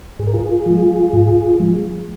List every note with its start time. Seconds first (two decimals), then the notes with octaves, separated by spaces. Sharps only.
0.19 G#2 G#4
0.27 A#4
0.34 F4 G#4
0.66 F3 G#3
1.13 G#2
1.60 F3 G#3